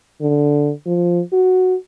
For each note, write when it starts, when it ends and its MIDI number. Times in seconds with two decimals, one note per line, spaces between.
0.21 0.72 50
0.86 1.21 53
1.33 1.75 66